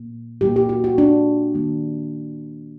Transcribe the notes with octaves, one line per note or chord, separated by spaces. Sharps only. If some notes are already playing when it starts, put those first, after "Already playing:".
Already playing: A#2 A#3
A#2 G3 A#3 G4
G4
F#4
F#4
D4
D#3 G3 A#3